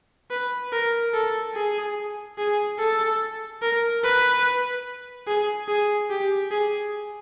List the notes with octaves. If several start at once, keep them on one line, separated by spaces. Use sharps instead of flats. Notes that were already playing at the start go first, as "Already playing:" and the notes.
B4
A#4
A4
G#4
G#4
A4
A#4
B4
G#4
G#4
G4
G#4